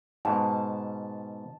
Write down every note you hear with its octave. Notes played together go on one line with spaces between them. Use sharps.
G#2 B2 A5